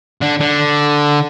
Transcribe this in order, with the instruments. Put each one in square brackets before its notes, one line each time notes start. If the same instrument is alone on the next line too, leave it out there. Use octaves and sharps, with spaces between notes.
[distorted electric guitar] D3
D3